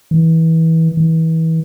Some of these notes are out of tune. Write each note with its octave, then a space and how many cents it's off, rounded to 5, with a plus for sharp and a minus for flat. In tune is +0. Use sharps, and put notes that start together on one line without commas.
E3 -25
E3 -30